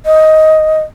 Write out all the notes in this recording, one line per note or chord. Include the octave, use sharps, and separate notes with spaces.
D#5